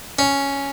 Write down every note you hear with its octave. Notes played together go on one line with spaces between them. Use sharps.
C#4